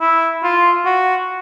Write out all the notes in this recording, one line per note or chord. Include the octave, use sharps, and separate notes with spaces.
E4
F4
F#4